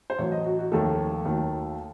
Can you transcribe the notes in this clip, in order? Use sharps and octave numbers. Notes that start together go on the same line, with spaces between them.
C5
A1 A2 F#3 C#5
D#5
F#4
F#4
F1 D#2 D#3 A3 A4
D#2 D#3 F#3 A3